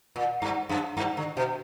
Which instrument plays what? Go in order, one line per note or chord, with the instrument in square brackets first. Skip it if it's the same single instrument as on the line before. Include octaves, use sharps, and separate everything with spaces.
[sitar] A#2
G2
F#2
G2
D3
B2